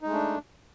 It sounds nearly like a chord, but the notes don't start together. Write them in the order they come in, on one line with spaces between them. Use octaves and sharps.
D#4 G#3 A3 D4